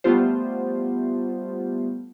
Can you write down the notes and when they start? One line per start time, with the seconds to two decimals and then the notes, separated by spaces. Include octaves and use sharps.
0.04 G3 A3 B3 F4 G4 C5